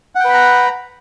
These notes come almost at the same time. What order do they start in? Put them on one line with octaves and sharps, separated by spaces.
F#5 G5 B4 B5 A#5